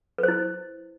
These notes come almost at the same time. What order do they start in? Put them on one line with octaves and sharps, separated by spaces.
B4 C5 E4